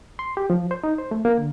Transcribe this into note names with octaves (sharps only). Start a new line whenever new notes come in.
C6
G4
F3
C5
D#4
C5
A3
A#3
D3